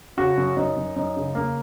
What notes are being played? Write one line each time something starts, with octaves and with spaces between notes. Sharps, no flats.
C#3 F#4
F#2
F#2 D#4
F#2
F#2 D#4
C#3
C#3 A#3